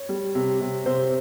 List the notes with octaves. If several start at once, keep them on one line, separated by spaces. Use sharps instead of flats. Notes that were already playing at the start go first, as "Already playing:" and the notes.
Already playing: C#5
G3
C3
C3
C3 C5